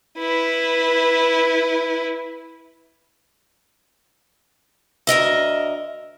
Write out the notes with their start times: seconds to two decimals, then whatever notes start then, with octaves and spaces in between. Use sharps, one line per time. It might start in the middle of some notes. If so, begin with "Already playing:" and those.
0.18 E4 B4
5.07 D2 A#4 D#5 E5